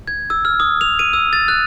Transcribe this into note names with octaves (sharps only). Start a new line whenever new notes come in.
G#6
E6
F6
D#6
F7
D#7
E6
A6
F#6